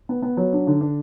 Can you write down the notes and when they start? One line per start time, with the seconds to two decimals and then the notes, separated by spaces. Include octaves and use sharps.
0.09 B3
0.22 B3
0.37 F#3
0.53 D4
0.67 D3
0.81 D4